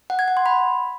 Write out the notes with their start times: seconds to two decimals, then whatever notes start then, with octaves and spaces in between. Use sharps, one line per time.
0.10 F#5
0.19 G#6
0.28 F#5
0.37 C6
0.46 B5